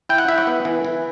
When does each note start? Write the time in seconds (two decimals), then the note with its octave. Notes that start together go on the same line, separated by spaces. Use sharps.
0.09 E4 G5
0.18 F#5
0.28 E4 E5
0.38 F#5
0.47 B3
0.65 E3
0.85 E3